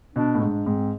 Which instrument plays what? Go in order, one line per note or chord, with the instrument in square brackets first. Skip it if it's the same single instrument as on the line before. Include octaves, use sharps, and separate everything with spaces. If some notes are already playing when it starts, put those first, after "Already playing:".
[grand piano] B2 [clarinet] D4
[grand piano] A2
[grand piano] G#2 [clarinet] D4
[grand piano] G#2 [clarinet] C4